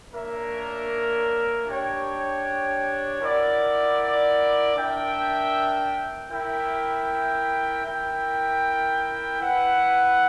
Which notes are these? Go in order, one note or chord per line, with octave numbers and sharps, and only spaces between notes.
A#3 D4 A#4 C#5 E5
D4 G4 C#5 G5
E4 A#4 D5 F#5
D4 A#4 E5 G5
E4 A#4 E5 G5
E4 A#4 E5 G5
E4 B4 F#5